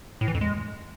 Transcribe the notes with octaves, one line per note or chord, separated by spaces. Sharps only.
A2
E3
F2
G#3